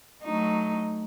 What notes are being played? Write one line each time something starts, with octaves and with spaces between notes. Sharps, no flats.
F#3 A3 D#4